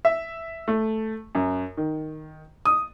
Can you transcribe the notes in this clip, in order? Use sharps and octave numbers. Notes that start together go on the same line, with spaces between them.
E5
A3
F#2
D#3
D#6